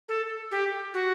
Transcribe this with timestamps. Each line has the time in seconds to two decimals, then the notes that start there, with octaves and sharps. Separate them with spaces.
0.09 A4
0.51 G4
0.94 F#4